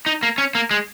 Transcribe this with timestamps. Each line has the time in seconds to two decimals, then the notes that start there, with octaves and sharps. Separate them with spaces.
0.06 D#4
0.23 A#3
0.38 C#4
0.55 A#3
0.71 G#3